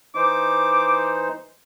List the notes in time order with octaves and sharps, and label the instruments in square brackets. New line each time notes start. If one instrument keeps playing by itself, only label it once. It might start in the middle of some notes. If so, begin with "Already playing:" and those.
[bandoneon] E3 D#4 C5 [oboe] D6